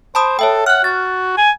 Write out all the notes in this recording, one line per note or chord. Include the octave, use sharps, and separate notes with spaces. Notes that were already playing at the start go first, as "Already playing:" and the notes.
C5 A5 B5 D#6
A4 C#5 E5 G5
F#5 F6 F#6
F#4 A6
G#5